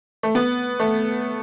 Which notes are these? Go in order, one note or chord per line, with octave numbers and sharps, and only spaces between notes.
A3
B3
A3